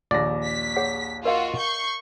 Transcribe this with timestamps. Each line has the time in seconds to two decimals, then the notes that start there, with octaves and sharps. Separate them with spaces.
0.11 A#1 D#2 G#4 D5 A#6
0.45 B6
0.76 G#4 C#5 F#5
1.25 F4 F#4 A#4 D#5 F5
1.58 C#6 G6 C7